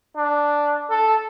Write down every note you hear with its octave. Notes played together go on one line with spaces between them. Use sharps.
D4
A4